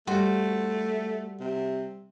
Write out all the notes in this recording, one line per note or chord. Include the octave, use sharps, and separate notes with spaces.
G3 A3 F#4 C5
C3